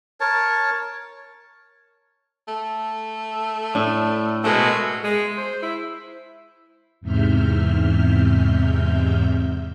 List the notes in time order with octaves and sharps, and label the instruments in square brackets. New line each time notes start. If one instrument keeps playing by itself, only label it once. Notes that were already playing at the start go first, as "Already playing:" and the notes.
[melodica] A#4 C#5 A5
[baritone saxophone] A3
[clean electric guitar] A2 [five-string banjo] D4
[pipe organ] B2 G#3 F#4 [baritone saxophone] A3 [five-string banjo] A4 A#4 C5
[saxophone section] G#3
C5
E4
[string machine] E2 G#2 C3 E5 F6 G6